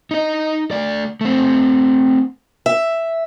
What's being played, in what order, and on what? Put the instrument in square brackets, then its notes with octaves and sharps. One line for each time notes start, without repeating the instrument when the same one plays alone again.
[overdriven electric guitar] D#4 D#5
A3 D5
A3 C4
[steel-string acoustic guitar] E5